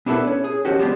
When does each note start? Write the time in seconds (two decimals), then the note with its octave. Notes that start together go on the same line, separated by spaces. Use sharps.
0.06 B3 D4 E4 F#4 A4 B4
0.27 C#4
0.44 G#4
0.65 D#3 F3 C#4 F#4 G4
0.79 F3 G3 G#3 B3 C4 D4